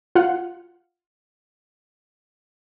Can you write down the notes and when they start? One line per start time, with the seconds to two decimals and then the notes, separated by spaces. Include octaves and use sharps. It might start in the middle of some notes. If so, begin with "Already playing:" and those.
0.15 F4 F5 F#5